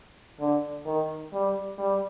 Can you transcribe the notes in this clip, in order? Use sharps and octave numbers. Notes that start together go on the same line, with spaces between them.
D3
D#3
G3
G3